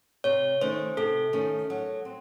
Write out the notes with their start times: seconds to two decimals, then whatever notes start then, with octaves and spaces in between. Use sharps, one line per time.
0.24 C3 C#5
0.61 D#3 A3 C#4 C5
0.97 C3 A4
1.33 D#3 A3 C#4
1.70 F#3
2.05 C4